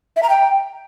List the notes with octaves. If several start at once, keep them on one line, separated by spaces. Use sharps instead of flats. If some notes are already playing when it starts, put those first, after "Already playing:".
E5
A#5
G5